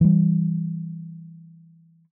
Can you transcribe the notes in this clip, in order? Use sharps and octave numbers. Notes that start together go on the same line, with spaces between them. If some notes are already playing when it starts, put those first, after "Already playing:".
E3 G3